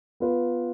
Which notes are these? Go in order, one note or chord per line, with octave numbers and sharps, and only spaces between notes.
B3 F4 B4